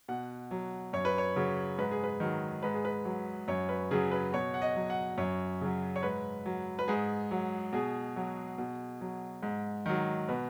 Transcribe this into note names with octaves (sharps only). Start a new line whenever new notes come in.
B2 F#5
F#3
F#2 C#5
B4
C#5
C#3 F#3
G#2 B4
G#4
B4
D#3 F#3
G#2 B4
G#4
B4
F#3
F#2 C#5
B4
C#3 F#3 G#4
B4
B2 C#5
F#5
D#5
F#3
F#5
F#2 C#5
C#3 F#3
C#5
G#2 B4
F#3
B4
G#2 G#4
F#3
B2 G#4
F#3
B2
F#3
G#2
D#3 F#3
B2 B4